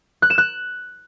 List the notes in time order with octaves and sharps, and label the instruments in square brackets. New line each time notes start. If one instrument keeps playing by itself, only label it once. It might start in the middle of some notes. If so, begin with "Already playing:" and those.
[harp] F#6
E7
F#6